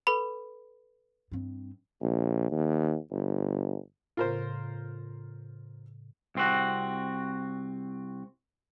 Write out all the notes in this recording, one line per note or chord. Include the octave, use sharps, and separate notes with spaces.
A4 B4 B5
G2 C4
A#1
D#2
G1
A2 C#3 F4 A#4 C5
C2 C4 F#4